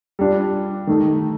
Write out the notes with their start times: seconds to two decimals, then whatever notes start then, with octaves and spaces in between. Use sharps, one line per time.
0.19 G3 D4 F4
0.87 D#3 A3 D#4 A4